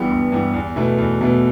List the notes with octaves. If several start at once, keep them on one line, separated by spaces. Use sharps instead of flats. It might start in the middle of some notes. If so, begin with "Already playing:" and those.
Already playing: G1 G2 E3 B3 G4
G1
G2 E3 B3 G4
E2
B2 A3 E4 B4
E2
B2 A3 E4 B4